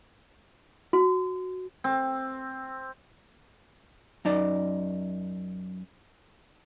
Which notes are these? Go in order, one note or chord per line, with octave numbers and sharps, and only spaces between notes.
F#4
C4
F#2 D#4 D5